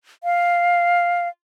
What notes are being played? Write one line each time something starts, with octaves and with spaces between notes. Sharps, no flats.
F5